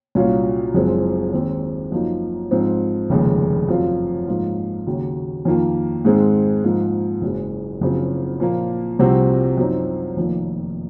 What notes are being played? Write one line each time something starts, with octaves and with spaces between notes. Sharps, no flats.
C2 A#2 F#3 C#4 F4
F#1 F#2 F3 G#3 C4
D#2 D#3 G#3 C4
F#2 F3 A#3 D#4
G#2 F3 C4
F1 D#2 C#3 G#3
F#2 F3 C4 F4
G#2 F3 A#3 F4
D#2 C#3 F#3
F2 D#3 A#3 F4
G#2 D#3 G#3 C4
G#2 F3 A#3
F#1 F#2 C#3 G#3
F#1 F#2 C#3 F3 C4
A#2 F3 A#3
C2 C3 F3 C4 F#4
F#2 F3 C4 D#4
F1 F2 D#3 A#3